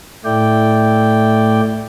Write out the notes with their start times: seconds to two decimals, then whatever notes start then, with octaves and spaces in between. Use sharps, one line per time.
0.25 A2 A3 E4 D5 G5